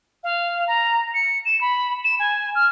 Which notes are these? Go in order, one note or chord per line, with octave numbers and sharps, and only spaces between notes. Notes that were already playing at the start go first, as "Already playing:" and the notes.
F5
A#5
C#7
E7
B5
E7
G#5
F6